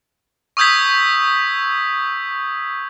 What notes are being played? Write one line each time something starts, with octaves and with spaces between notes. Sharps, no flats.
C#6 D#6 E6 G6 G#6 B6